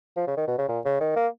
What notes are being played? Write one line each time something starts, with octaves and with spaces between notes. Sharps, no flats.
F3
C#3
D#3
B2
C#3
A#2
C#3
D#3
A#3